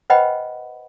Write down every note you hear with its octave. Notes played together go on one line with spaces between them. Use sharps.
B4 C5 D#5 F#5 G5 B5